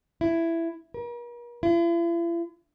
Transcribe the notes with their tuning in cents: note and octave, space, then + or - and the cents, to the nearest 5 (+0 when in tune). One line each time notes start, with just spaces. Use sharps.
E4 +10
A#4 +45
E4 +45